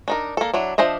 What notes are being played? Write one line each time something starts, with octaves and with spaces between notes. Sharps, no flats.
D4 D#4 A#4
A#3 A4
F#3 D4 E4
F3 D4 C5 D#5 E5